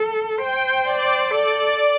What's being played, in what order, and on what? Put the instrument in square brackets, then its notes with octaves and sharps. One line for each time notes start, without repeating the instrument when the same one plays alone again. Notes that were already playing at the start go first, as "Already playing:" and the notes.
Already playing: [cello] A4
[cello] C5 [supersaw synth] G5
[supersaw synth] D5
[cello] A4 [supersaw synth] D5